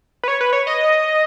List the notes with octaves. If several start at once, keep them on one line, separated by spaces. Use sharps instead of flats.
B4
C#5
B4
C#5
D#5